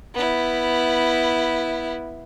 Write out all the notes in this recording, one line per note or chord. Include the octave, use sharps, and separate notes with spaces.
B3 E4